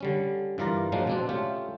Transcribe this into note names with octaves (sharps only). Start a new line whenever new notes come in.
D3 G3 C#4
G2 E3 F4 A#4 D5 A#5
A#2 F3 F#3 G#3 A#3 D4
B2 C4 D4
A3 C#4 F4 G4